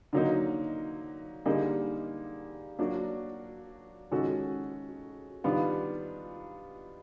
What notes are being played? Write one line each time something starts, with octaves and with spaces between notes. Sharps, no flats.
D3 F#3 A#3 D#4
D3 G3 A#3 D#4 G#4
F#3 A#3 D4 F#4
D#3 G#3 C#4 F#4 A4
D#3 G3 B3 D4 F4